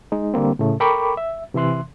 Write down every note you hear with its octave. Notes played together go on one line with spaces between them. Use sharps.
G#3 D#4
D3 G3 A#3 C4
A2 C#3 A3
A4 A#4 G5 B5 C#6 D6
E5
C3 E3 E5 C6 F#6